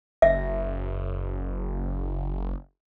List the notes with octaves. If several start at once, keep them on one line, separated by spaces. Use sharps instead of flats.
F#1 E5